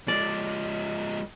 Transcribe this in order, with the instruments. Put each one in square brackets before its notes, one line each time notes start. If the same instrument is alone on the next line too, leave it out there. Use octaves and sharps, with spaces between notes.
[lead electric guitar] F3 G#3 [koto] D5